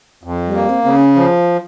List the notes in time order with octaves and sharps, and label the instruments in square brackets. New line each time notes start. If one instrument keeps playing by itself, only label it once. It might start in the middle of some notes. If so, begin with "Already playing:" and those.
[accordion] F2
[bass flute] G3
[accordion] A#3
[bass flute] C4
[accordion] C#3 [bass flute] C4
[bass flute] C#4
[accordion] F3